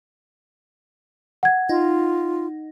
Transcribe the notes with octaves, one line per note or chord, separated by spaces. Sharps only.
F#5 G#6
D#4 F4